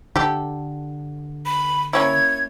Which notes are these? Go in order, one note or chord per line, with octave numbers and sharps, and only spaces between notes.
D3 G4 A4
B5
A#3 C#4 E4 G#6